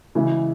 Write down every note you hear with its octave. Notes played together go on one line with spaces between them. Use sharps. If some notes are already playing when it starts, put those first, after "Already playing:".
C#3 E3 G#3 E4